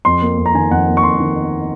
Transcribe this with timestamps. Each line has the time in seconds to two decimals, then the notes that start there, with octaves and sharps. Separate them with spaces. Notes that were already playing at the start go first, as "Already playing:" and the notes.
0.05 F2 C6
0.22 A#3
0.38 F2
0.46 A#5
0.54 D#3 G#5
0.71 F2 F#5
0.88 A#3
0.97 C#6
1.03 F2 C6
1.20 D#3